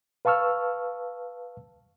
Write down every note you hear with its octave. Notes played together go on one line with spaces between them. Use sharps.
B4 F5 A5 C#6 E6 F6